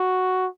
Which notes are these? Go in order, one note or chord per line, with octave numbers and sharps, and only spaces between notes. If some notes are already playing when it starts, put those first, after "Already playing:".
Already playing: F#4